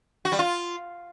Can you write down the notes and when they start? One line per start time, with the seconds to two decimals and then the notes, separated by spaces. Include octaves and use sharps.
0.25 F#4
0.32 G3
0.39 F4